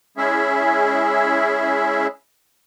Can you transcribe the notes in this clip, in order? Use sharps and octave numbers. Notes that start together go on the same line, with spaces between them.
G#3 C#4 E4 G#4 E5